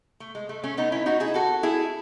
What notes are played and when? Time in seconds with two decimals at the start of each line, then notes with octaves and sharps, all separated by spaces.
0.20 A3
0.35 G#3
0.49 A3
0.63 A3 C#4
0.77 B3 D#4
0.92 C#4 E4
1.06 D#4 F#4
1.20 E4 G#4
1.34 F#4 A4
1.63 E4 G#4